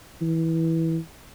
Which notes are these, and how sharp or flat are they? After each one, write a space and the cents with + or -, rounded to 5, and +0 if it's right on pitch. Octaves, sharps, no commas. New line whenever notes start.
E3 -15